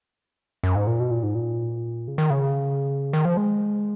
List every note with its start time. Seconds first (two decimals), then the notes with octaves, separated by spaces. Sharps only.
0.63 F#2
0.75 G#2
0.87 A#2
1.00 B2
1.11 A#2
1.23 G#2
1.35 A#2
2.08 C#3
2.18 D#3
2.30 C#3
3.13 D#3
3.25 F3
3.37 G#3